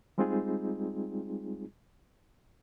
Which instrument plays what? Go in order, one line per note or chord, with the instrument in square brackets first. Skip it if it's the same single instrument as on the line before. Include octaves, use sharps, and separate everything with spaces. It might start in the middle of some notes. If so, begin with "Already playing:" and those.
[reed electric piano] G3 G#3 C4 D#4 F4 G#4